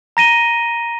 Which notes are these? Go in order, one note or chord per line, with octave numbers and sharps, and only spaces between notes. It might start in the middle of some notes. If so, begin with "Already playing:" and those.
A#5 A#6 D#7 G7